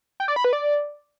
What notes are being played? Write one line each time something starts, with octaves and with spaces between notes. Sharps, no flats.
G5
D5
B5
B4
D5